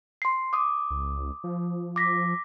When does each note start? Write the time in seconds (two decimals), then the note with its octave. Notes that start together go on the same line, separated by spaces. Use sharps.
0.22 C6 C7
0.53 D6 D#6
0.90 C#2
1.44 F3
1.96 D6 A#6 B6